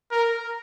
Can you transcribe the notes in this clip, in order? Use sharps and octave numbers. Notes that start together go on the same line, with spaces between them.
A#4